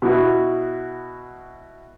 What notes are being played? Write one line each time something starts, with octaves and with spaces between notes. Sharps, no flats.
B2 B3 E4 F#4